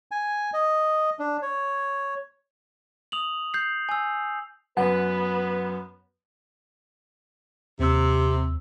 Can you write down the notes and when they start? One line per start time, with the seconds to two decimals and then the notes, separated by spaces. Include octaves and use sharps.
0.11 G#5
0.53 D#5
1.19 D4
1.42 C#5
3.12 D#6 F7 F#7
3.54 G6 C7
3.89 G#5 E6
4.77 F#2 B3 B4 F#5
7.79 D#2 C3 E6